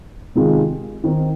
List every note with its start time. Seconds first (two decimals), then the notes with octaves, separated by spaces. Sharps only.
0.35 C3 D#3 G#3 F4
1.04 D#3 C4 D#4